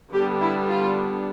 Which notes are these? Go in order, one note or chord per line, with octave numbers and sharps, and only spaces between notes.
D3 G3 B3 D4 G4
E4
F4